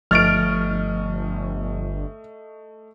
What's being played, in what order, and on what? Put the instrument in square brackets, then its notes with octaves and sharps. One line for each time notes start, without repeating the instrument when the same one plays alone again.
[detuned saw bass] G1 [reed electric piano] F3 A6 [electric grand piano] A3 D#5 C#6 [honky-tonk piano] F6 D7